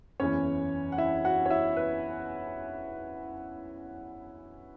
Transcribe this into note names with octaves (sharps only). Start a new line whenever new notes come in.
F#1 E2 E3 C#4 C#5
F#5
E4 E5
F#4 F#5
C#5
E4 E5
B4